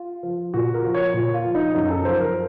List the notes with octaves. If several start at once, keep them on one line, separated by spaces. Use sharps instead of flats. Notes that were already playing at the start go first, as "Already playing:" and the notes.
Already playing: F4
F3
A#2 F#4
A#4
F3
C#5
A#2
F4
F3
D#4
F#2 D#4
A4
F3 C5
A#4